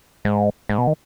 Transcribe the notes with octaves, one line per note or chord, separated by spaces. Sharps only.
G#2
G#2
B2
D#3